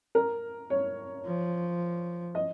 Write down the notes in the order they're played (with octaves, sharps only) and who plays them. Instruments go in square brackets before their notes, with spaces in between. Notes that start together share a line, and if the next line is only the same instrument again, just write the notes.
[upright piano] A#4
C#5
[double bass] F3
[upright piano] D#5